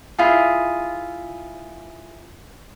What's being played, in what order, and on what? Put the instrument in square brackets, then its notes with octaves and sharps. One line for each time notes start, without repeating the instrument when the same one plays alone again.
[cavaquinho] E4 F4 G#4